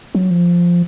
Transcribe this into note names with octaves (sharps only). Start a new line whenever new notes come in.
F#3
F3